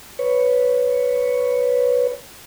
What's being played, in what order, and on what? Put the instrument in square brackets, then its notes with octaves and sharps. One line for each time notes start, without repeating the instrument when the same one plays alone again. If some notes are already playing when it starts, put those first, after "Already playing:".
[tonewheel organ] B4 C#5